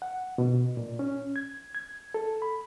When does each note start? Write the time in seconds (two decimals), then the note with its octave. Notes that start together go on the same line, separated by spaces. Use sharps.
0.02 F#5
0.38 B2
0.77 A#2
0.99 C#4
1.36 G#6
1.75 G#6
2.14 A4
2.42 B5